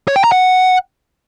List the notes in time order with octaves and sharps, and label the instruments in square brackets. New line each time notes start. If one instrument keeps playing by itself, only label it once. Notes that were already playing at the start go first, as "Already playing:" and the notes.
[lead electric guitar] C#5
G5
A#5
F#5